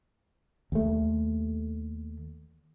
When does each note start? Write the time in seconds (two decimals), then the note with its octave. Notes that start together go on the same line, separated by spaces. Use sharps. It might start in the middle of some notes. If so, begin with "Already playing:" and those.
0.72 D#2 A3